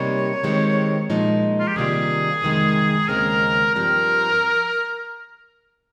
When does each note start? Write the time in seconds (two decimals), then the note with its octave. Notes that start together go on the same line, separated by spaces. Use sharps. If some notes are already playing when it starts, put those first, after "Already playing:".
Already playing: C3 G3 A#3 D#4 C#5
0.44 D#3 G#3 C4 G4
1.10 A#2 F3 G#3 D#4
1.60 F4
1.67 G4
1.76 C3 D#3 G3 A#3 F4 G#4
2.42 F2 C3 D#3 G#3
3.08 D#2 C#3 G#3 C4 A#4
3.75 G2 F3 C4 G4 A#4